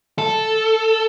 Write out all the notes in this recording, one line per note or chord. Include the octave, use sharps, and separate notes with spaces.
A4